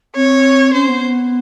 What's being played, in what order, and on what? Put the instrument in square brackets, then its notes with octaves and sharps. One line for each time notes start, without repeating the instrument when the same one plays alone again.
[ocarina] C4 [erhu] C#5
[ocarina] C#4 [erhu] C5
[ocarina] B3